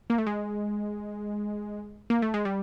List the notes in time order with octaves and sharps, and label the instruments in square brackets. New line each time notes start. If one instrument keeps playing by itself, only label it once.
[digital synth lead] A#3
A3
G#3
A#3
A3
G#3
G3